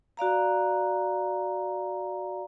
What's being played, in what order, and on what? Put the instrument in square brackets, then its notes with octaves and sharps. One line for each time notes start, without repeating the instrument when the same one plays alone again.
[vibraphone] F#4 D5 F5 A#5